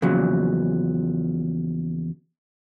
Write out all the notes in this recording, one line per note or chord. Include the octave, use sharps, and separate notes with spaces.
E2 A#2 C#3 F3 F#3